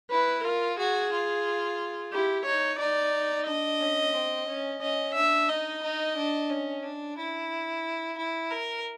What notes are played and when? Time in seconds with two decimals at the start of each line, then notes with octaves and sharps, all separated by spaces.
0.11 E4 B4
0.44 F4 A#4
0.78 F#4 G#4
1.12 F4
2.13 E4 G4
2.46 D#4 C#5
2.80 D#4 D5
3.47 D4 D#5
3.80 C#4
4.14 C4
4.47 C#4
4.81 C#4 D#5
5.15 D4 E5
5.49 D#4 D#5
5.82 D#4
6.16 D4
6.50 C#4
6.83 D4
7.17 E4
8.17 E4
8.51 A#4